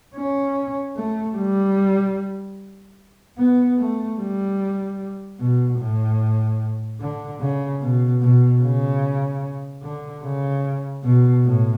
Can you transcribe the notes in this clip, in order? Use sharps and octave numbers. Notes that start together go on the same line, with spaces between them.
C#4
A3
G3
B3
A3
G3
B2
A2
D3
C#3
B2
B2
C#3
D3
C#3
B2
A2